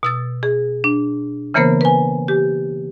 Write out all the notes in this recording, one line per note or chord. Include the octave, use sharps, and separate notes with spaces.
B2 E6 A6
G#4
D4
C#3 E3 A#3 B3 A#4 C5
B4 G#5
G4